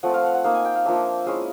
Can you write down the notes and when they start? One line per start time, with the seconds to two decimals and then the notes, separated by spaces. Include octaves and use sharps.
0.03 F3 A3 C4 F#5
0.14 F5
0.24 F#5
0.34 F#5
0.44 A#3 D#4 F5
0.54 G#5
0.65 G5
0.75 F5
0.85 F3 A#3 D4 E5
1.26 G#3 C#4 E4 F5